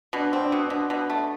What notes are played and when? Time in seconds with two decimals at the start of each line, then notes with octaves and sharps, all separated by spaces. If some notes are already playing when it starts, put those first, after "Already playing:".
0.13 B2 D4
0.33 C4
0.39 D4
0.52 B2
0.65 D4
0.70 B2
0.90 B2
1.10 A3